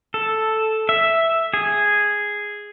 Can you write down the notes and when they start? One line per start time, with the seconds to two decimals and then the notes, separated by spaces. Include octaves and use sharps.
0.14 A4
0.89 E5
1.54 G#4